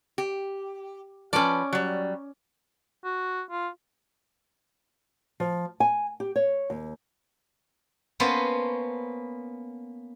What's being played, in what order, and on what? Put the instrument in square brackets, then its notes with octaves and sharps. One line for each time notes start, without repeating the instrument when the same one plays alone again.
[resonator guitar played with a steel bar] G4
[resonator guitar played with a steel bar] F3 B4 [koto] C#4 D5
[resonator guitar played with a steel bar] F#3 G3
[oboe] F#4
F4
[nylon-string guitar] F3
G#5
G4
C#5
D#2
[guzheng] A#3 B3 C#4 C5 A5